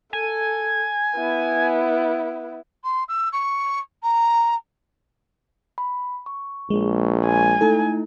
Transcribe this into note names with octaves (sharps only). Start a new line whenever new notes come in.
A4 G#5
B3 E4
C6
E6
C#6
A#5
B5
C#6
A#1 G#3
G#5
A3 D#4 E4 A4